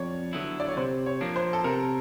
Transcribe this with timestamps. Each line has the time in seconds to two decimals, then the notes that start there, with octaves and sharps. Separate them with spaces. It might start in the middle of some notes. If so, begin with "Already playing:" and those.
Already playing: F2 C#5 D5
0.33 D3 F#3 B3 E4
0.60 D5
0.68 C#5
0.77 C3 C5
1.06 C#5
1.21 F3 A#3 D4
1.36 C5
1.53 A4
1.64 C3 A#4